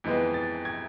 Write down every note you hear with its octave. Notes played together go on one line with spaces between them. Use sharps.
F2 E3 G#3 B3
A6
G#6